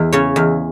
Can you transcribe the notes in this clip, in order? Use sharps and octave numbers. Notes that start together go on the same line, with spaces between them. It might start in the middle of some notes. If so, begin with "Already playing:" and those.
Already playing: E2
C#3 C#5
E2